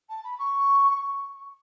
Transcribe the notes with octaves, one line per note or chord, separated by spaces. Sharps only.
A5
B5
C#6